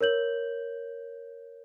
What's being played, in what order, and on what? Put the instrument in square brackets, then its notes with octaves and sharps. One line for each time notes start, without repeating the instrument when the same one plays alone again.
[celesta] A#4 C#5 G6 F#7